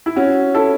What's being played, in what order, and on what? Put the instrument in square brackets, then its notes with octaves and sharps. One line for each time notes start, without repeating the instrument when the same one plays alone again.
[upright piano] E4
C#4 F#4
E4 A4